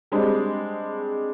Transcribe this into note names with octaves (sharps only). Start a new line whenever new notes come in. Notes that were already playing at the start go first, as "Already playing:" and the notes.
G3 G#3 C4 D4